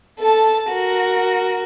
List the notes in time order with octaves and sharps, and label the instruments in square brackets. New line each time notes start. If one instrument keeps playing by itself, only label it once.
[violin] A4 A5
F#4 A#4